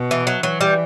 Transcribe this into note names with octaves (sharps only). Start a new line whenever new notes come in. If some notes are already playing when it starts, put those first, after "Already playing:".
Already playing: B2
E3
F#3
E3 F#3
G3